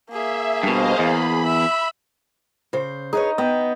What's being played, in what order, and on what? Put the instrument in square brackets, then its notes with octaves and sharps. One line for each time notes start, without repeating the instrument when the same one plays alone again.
[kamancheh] A#3 G#4 [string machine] E5
[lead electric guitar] G2 B2 [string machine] C5 D#5 F5
[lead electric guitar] E2 [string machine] B5
[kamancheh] E5
[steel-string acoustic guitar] C#3 C5
[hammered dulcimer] D#4 [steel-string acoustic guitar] G#4 B4 C#5
[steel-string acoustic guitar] B3 [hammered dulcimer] D#5 G5